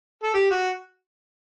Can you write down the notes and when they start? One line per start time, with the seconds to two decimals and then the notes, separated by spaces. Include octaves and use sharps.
0.24 A4
0.34 G4
0.51 F#4